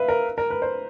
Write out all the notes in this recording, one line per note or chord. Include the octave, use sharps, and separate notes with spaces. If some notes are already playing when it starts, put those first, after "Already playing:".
Already playing: B4 E5 F5
A#4
A#4
B4
C5